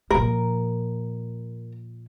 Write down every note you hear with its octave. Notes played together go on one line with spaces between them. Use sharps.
A#2 F3 A#4